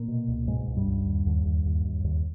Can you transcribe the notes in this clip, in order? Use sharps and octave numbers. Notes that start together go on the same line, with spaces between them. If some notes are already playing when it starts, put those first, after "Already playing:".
Already playing: A#2 A#3
B2
C#2
G#2 B2 G#3
C#2
G2 G3
C#2
D#2
D#2
D#2
D#2
D#2
D#2